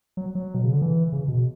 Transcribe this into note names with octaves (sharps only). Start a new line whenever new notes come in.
F#3
F#3
B2
C#3
D3
E3
C#3
B2